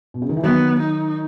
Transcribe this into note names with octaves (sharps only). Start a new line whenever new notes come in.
B2
C#3
D#3
E3
D#3 F#3 B3
D#4